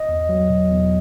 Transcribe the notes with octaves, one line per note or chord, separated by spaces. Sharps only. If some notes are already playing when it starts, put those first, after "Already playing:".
Already playing: D#5
E2
F#3
B2
E2